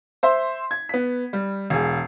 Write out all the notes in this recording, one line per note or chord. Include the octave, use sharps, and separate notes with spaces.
C5 E5 C6
G#6
B3 B6
G3
E1 G#4